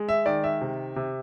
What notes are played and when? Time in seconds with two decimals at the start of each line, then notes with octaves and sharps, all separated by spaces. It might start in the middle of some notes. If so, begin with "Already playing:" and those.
Already playing: G#3
0.09 E5
0.26 D#3 D5
0.44 E5
0.61 C3
0.96 C3